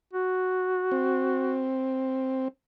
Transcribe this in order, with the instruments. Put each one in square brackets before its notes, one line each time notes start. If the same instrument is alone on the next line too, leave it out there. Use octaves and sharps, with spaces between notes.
[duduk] F#4
[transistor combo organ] C4